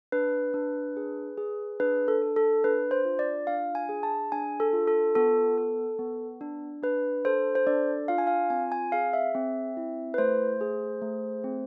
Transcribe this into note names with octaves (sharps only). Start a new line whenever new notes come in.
D4 B4
D4
G#4
G#4
D4 B4
A4
A4
A4
D4 B4
C5
F4
D5
D4 F5
G#5
G#4
A5
D4 G#5
A4
F4
A4
B3 A4
A4
B3
D4
D4 B4
A4 C5
C5
D4 D5
F4 F5
G#5
F5
C4 G#5
G#5
G#4 F5
E5
C4
E4
B4
A3 C5
G#4
A3
C4